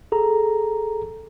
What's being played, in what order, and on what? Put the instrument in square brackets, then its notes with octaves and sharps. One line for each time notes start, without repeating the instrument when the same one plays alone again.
[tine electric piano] G#4 A4 A#5